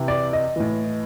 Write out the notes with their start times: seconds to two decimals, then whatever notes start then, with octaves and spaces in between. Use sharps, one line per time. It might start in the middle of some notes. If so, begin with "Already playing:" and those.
Already playing: C3 E3
0.08 D5
0.33 D#5
0.56 A2 E3